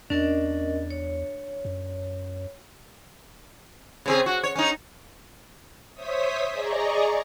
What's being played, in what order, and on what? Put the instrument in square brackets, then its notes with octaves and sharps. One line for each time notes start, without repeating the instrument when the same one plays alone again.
[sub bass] E2 [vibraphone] C#4 A#4 D#5 [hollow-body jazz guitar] D4
[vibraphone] C#5
[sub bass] F#2
[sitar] C#3 C4 G#4
F#4
C#5
C#4 D#4
[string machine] C5 C#5 E5 D#6 B6
G#4 D5 D#5 A#5 C#6